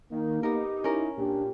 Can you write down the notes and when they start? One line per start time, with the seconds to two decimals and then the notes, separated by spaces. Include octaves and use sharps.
0.12 D#3 A#3 D#4
0.43 B3 D#4 G4 A#4
0.84 C#4 E4 A#4
1.17 A#2 D4 G4